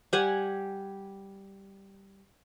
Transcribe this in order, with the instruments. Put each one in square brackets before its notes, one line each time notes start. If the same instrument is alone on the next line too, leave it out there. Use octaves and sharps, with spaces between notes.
[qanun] G3 G4 F#5 G#5